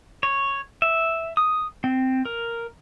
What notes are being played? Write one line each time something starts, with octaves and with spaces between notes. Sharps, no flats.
C#5
E5
D#6
C4
A#4